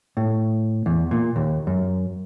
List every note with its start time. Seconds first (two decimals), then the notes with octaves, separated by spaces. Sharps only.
0.17 A2
0.86 E2
1.11 A#2
1.36 D#2
1.67 F#2